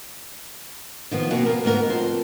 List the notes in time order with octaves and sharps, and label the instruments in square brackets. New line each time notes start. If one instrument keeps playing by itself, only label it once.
[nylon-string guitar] D#3 F3 B3
B2 F3 A#3 C4 F#4
A#3 A#4
D2 G#2 B3 A#4
F2 C5